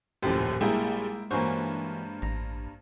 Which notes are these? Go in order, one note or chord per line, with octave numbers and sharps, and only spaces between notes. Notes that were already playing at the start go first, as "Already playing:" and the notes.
D#1 F#2 A2 F3 G4
A#1 G3 G#3 A#3 E4 G#4 G5
G2 E3 A#3 C#4 F#4 C5
A1 A#5